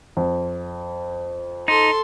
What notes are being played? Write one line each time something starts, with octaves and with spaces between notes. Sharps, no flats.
F2
D#4 A4 C6